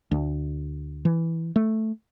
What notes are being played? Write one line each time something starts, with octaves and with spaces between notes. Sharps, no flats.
D2
E3
A3